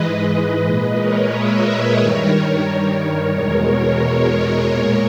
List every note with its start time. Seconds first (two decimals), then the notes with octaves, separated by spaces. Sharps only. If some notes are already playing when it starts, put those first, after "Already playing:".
Already playing: G#2 E3 G#3 B4 D#5
0.64 A#2 G#3 B4 D#5
0.97 A#4 C#5
1.31 C#5 E5
1.64 C#5 E5
1.98 G2 D#3 G3 A#4 C#5
3.32 E2 B2 G#3 A#4 C#5
4.67 A#2 G#3 A#4 C#5